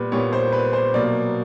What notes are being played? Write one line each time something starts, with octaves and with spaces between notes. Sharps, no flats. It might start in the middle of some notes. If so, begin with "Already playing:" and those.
Already playing: A#2 G3 B3 B4
A#2 G3 B3 C#5
C5
B4
C5
B2 F#3 A#3 D5